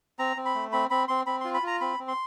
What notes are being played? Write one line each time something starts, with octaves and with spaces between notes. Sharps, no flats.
C4 A#5
C4
B5
A3
C4 B5
C4 B5
C4 C6
C4 B5
F4 C6
B5
F4 A#5
C4 B5
C4
C6